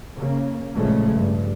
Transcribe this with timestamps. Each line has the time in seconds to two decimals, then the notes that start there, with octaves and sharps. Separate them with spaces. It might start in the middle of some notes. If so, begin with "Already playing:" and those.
0.17 C#3 A#3
0.75 A1 A#2 C#3 F3 G#3 A3
1.16 G2